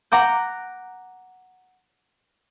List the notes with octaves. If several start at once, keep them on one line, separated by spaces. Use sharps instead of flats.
F#5 A#5 D6 G6